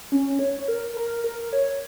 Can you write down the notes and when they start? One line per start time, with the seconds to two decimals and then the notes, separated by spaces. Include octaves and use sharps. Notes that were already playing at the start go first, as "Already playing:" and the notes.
0.12 C#4
0.39 C#5
0.68 A#4
0.97 A#4
1.24 A#4
1.53 C#5